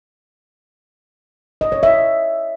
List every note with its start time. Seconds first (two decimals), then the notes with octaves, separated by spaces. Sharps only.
1.61 D#5
1.72 C#5
1.83 E5